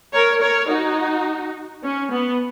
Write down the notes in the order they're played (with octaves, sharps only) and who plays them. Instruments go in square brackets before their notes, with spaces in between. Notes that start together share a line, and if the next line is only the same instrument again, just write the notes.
[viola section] A#4 C#5
A#4 C#5
D#4 F#4
C#4
B3